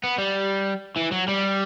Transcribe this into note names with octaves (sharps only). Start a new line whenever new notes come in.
B3
G3
E3
F#3
G3